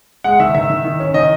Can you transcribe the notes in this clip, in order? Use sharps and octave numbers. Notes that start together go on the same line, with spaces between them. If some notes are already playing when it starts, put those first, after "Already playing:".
G#3 F#5
D#3 E5
D#3 E5
D#3
D#3
C#4
D#3 D#5